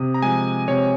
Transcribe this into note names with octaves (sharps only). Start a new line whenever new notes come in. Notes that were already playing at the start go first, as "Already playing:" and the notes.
Already playing: C3 D#6
A#5
F3 G#3 G#5
C3 C#5